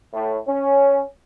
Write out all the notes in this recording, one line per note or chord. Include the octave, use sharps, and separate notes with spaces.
A2
C#4